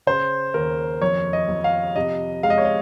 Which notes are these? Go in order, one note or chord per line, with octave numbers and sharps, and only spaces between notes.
C#3 C5
D#2 A#4
F2 C#5
D#5
F2
F5
C3 D#5
G#3 F5
D#5
C#5
D#5